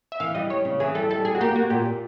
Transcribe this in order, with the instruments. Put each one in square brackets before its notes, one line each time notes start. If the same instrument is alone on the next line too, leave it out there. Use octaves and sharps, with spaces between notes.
[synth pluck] E5
[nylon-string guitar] E3 [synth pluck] F5
[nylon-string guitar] G3 [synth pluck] D#5
[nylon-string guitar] G3 [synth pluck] C#5
[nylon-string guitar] C#3
[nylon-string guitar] E3 [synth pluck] G#4
[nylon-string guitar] G3 [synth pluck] A4
[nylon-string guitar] G3 [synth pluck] A4
[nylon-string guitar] G3 [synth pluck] G#4
[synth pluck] F#4
[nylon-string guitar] A#3 [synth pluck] G4
[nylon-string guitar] A#3 [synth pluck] F#4
[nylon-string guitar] A#2 [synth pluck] G4
[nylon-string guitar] A#2